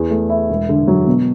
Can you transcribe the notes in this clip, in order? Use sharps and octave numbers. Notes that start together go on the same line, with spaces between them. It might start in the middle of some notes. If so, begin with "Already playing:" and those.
Already playing: E2
A3
E4
E1
D3
F#3
B2